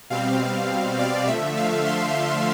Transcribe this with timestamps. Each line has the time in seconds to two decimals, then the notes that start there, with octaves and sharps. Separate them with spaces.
0.10 B2 G3 C4 F5
0.99 D5
1.27 D3 F3 A3 E5
1.57 F5
1.86 C6